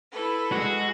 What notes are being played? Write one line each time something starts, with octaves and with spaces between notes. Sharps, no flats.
E4 A4 B4
G#3 F#4